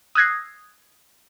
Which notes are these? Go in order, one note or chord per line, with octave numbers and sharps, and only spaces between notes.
D#6 E6 F#6 G#6 A#6 C7